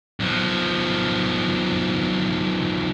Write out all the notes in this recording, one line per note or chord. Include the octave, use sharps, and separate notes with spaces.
B1 F3